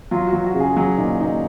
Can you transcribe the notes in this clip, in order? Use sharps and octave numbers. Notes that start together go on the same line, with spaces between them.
F#3 F4
F#4
F#3
F#4
C#3
G#4
F#3 G#4
A#2 D#4
A#2 D#4